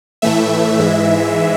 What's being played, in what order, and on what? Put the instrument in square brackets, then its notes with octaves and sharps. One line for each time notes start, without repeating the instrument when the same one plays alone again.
[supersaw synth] A2 E3 A3 E5
G#2 E3 G#3